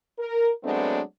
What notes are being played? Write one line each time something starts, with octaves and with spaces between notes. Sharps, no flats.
A#4
F#3 G#3 A3 B3 C4 D4